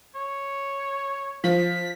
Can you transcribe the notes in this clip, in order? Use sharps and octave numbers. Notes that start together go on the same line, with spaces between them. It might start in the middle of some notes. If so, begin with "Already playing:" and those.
C#5
F3 B6